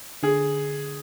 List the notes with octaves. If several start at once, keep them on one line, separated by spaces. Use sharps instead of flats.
D3 G#4